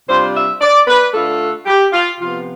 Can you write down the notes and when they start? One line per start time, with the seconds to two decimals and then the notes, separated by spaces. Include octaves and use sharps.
0.08 C3 G3 D4 F4 C5
0.35 E5
0.61 D5
0.87 B4
1.13 D3 A3 D4 F4 A4
1.66 G4
1.92 F4
2.19 C3 F3 B3 F4